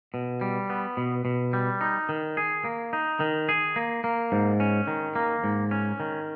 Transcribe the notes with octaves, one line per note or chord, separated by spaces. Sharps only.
B2
G3
B3
B2
B2
G3
D#4
D#3
G#4
A#3
D#4
D#3
G#4
A#3
A#3
G#2
C#4
D#3
A#3
G#2
C#4
D#3